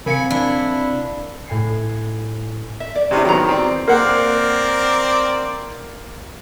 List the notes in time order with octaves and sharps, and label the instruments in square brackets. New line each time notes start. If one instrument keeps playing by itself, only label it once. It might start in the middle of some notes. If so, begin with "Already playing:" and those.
[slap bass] C3 [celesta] A#4 F5 C#7 [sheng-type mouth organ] G#5 B5
[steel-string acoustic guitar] D4 [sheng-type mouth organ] E4
[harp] A2 G#5 C7 C#7
[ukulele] E5
D5
[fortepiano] A#1 C#4 E4 [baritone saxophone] C3
[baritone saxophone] D#3 [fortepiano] F#3 B3 [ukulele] F#4 G#4 A#5
[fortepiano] C4 D5
[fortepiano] A#3 F#5 [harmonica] C4 A#4 D5